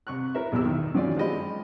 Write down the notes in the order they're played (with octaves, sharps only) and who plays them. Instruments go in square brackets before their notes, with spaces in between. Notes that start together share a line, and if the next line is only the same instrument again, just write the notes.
[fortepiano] C2 C#6 F#6
E4 A#4 E5
B1 E2 E4 G4 E6
D#3
F#2 D#3 E3 F4 F#4 D5
F3 G#3 G4 D#5 B5